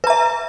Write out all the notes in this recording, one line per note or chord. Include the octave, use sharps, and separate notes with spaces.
B4 E5 A#5